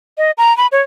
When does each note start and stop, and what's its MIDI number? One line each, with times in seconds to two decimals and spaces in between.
0.18 0.31 75
0.38 0.55 82
0.57 0.67 83
0.72 0.81 73